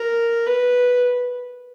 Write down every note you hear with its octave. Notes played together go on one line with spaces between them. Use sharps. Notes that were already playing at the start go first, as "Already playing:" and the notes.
Already playing: A#4
B4